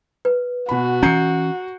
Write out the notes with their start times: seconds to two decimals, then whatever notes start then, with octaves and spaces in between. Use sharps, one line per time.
0.25 B4
0.69 B2 F#4 B5
1.03 E3 C#4 A#5 G6 C7 C#7